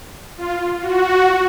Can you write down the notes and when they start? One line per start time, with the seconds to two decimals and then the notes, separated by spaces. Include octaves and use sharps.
0.37 F4
0.81 F#4